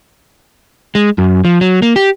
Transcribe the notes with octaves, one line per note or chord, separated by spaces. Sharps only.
G#3
F#2
F3
F#3
A#3
G4